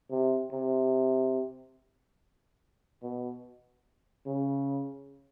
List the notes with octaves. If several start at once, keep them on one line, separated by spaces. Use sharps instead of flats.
C3
C3
B2
C#3